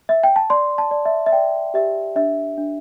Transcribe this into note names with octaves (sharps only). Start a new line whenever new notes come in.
E5
G5
A5
D5 C6
A5
D5
E5
E5
D5 G5
G4 E5
D4 E5
D4